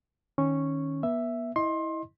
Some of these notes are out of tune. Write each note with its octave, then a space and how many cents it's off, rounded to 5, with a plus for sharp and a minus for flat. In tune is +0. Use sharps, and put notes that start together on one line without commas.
D#3 +0 C#4 -10 C#6 -5
B3 -35 E5 +5
E4 -20 D#5 +0 C6 +25